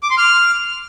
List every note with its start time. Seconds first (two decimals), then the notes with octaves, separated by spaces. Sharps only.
0.03 D6
0.10 C6
0.18 F6